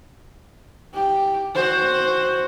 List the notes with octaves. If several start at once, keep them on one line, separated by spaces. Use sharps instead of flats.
G4
F#4 C5